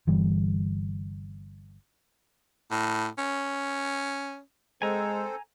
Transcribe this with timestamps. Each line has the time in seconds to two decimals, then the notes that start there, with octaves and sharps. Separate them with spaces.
0.07 G1 E3 G3
2.71 A2
3.18 C#4
4.82 G#3 C4 A4 C5 G#5 A#5